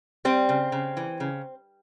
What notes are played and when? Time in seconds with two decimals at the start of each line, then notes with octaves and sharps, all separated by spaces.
0.25 G3 C4
0.49 C#3
0.72 C#3
0.97 E3
1.20 C#3